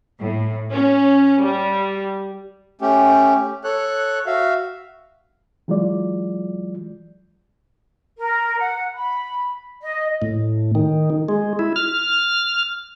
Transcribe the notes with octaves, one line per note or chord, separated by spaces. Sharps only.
A2
C#4
G3
A3 C#4 G4
A4 C#5 F#6
F#4 E5 F5
E3 F#3 G#3 F4 D5
A#4
F#5
B5
D#5
A2
D#3
G#3
E4
F6